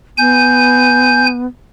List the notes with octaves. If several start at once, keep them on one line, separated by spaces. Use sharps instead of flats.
B3 G#5 G6